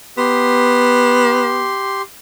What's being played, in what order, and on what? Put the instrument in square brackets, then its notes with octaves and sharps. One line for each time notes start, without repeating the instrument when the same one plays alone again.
[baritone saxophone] B3 [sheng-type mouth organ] G4 C6